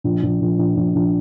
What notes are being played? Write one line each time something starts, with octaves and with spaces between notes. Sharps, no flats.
A#1
A#1
A#1
A#1
A#1
A#1